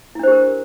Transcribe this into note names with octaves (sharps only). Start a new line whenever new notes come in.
D4 E4 G4 A#4 C5